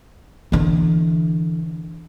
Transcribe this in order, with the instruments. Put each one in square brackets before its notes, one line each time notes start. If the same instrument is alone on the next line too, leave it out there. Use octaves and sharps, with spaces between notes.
[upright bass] D3 E3